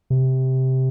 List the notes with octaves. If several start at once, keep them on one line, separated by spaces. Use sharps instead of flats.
C3